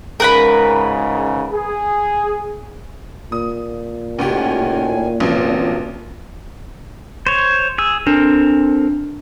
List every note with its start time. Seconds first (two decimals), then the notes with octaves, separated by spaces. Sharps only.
0.20 C#2 G#2 C#3 A#4 B4 B5
1.52 G#4
3.32 A#2 D#6
4.19 C#2 A2 D#3 F#4 G4 G#5
5.20 A1 G2 C3 F3 F#3
7.27 C5 C#5
7.78 G#4 E6
8.07 C4 D4 A4 A#4